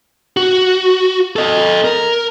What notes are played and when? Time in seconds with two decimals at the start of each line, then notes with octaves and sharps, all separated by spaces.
0.37 F#4
1.36 A4 D#5
1.85 A#4